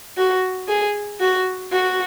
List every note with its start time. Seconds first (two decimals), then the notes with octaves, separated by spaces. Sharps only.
0.17 F#4
0.68 G#4
1.20 F#4
1.72 F#4